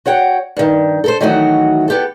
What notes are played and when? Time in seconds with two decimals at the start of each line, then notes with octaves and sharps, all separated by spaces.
0.06 F#4 C#5 F#5 G5
0.57 G2 D#3
1.04 A4 A#4 C5
1.21 D#3 E3 F#3 A3 D#4 F#4
1.88 B3 G4 A4